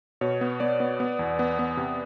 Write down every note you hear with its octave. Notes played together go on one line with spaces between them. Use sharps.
B2 C#5
B3
B3 D5
B3
B3
E2
B3
B3
C3